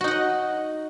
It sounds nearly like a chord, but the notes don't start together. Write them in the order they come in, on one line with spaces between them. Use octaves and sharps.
F#4 D#4 F#5 D#5